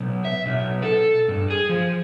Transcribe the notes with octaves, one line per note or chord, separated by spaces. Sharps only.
B1
E5
B1
A4
G2
G#4
F3